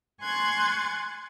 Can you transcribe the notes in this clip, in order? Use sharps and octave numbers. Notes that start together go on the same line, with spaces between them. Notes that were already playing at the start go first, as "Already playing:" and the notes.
G#5 C6 C#6 F#6 G#6 A6